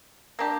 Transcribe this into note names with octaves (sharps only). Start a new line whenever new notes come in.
A#3 D4 G4